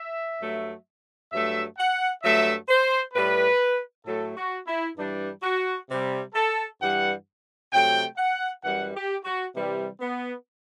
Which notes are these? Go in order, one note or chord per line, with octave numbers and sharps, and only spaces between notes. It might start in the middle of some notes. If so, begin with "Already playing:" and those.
Already playing: E5
G2 F#3 A3
G2 F#3 A3 E5
F#5
G2 F#3 A3 E5
C5
A2 G3 B4
A2 F#3 A3 A4
F#4
E4
G2 E3 G3 D4
F#4
C3 G3
A4
G2 E3 G3 F#5
C3 F#3 A3 G5
F#5
F#2 E3 G3 F#5
G4
F#4
C3 E3 G3
B3